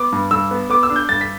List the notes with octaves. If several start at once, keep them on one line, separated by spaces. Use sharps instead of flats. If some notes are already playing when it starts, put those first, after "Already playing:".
Already playing: B3 D6
G2
G2 E6
B3
B3 D6
E6
D4
G6
G2 A6
B6